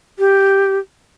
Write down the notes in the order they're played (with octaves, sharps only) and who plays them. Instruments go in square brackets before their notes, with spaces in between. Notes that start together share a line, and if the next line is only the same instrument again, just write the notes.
[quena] G4